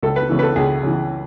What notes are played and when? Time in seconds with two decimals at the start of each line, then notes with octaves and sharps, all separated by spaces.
0.02 C#2 A4
0.16 B4
0.29 C#3 E3
0.39 B4
0.42 A4
0.56 C#2 G#4
0.83 C#3 E3